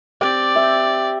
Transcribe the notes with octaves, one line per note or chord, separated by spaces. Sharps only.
C4 G4 D5 G5
E5